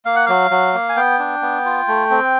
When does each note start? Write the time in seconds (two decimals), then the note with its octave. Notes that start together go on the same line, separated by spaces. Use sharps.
0.05 A#3 F5
0.16 F#5
0.26 F#3 F5
0.51 F#3
0.74 A#3
0.89 G#5
0.96 B3 G5
1.19 D4
1.42 B3
1.65 F4
1.88 A3
2.11 C4